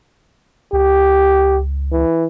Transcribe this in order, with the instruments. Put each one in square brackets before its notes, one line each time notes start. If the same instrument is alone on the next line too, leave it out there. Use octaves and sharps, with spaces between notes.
[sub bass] C#2 [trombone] G4
[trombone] E3